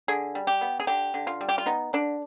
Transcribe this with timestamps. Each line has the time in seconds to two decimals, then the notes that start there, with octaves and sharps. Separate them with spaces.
0.08 D3 G#4
0.35 G3
0.47 G4
0.61 B3
0.80 G#4
0.87 D3 G4
1.14 D3
1.27 F4
1.41 G3
1.49 G4
1.58 F4
1.66 B3 D#4
1.93 D3 D4